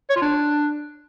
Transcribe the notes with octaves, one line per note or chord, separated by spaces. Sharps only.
C#5
F4
D4